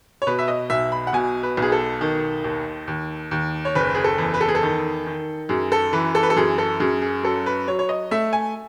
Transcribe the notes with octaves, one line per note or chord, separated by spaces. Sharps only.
C#5
B2 B4
E5
D#5
B1 E5
B5
F#5
B2 G#5
B4
B1 G#4
A4
D#3
D#2
D#2
D#2
C#5
F#1 B4
G#4
A4
E2
B4
A4
G#4
A4
D#3
D#3
F#2 G#4
A4
E3 B4
A4
B4
A4
F#2 G#4
A4
F#2 G#4
G#4
F#3 A4
B4
F#3 C#5
C#5
D#5
A3 E5
G#5